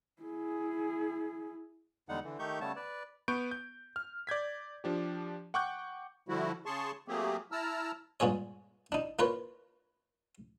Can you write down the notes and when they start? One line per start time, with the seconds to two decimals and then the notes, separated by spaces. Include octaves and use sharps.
0.22 E4 G#4
2.09 E2 D3 G3 G#3 D#4 F#5
2.24 D3 E3
2.39 D#3 A3 D#4 G4 C#6 G6
2.61 C#3 G3 A3 B3 C#5 A5
2.76 B4 D5
3.28 B3 B4 C#6 G6 D7
3.51 G6
3.96 F6
4.27 D5 G6 G#6 B6
4.84 F3 D4 G4
5.54 F#5 G5 C#6 D6 F#6 G6
6.29 D3 F3 G3 E4 F#4
6.66 C#3 G#4 A5 C6 C#6
7.08 F#3 A3 A#3 C4 G4 G#4
7.52 E4 A5 A#5 E6 F6
8.20 G2 A#2 G#3 G#4 C#5
8.92 D4 D#4
9.19 A#3 F4 A#4 B4 C#5